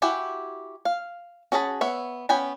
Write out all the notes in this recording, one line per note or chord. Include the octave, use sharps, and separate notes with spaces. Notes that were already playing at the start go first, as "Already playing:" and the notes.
E4 F#4 G4 G#5
F5
C#4 F#4 G#4 A5 B5
B3 C#5 E5
B3 C#4 G5 G#5 B5